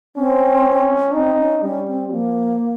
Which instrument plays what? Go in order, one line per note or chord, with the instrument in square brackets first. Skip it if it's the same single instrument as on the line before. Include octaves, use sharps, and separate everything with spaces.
[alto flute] C4 [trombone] C#4
[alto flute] C4 [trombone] D#4
[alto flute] C#4
[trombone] G3 [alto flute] C#4
[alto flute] C4
[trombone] F3 [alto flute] A#3